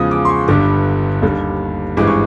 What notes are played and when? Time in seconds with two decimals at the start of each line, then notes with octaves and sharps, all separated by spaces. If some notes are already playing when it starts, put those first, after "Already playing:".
Already playing: E2 C#3 F3 G#3 D#6
0.11 D6
0.25 C6
0.29 C#6
0.48 G1 G2 D3 G3 D6
1.22 D#2 D3 G3
1.97 G#1 G2 E3 G#3 D6
2.07 C#6